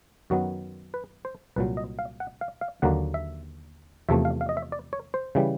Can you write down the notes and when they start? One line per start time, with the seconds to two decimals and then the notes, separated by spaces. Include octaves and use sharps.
0.30 F#2 D#3 F#3 B3 F#4
0.94 B4
1.25 C5
1.56 C2 A#2 F#3 B4
1.77 D#5
1.99 F5
2.20 F#5
2.41 F5
2.61 F5
2.82 D#2 D3 F#3 A#3 F#5
3.14 E5
4.09 E2 C3 F3 A3 E5
4.25 F5
4.41 F5
4.49 D#5
4.57 E5
4.72 D5
4.93 C#5
5.14 C5
5.35 C#3 E3 G3